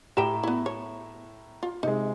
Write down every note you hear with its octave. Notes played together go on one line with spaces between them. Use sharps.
A2 G4 B4 G5 A#5 E7
B3 E4
C#5
F4
C3 G#3 D#4